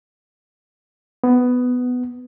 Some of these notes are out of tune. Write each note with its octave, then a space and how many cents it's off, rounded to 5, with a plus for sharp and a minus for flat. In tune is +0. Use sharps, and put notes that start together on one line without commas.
B3 +10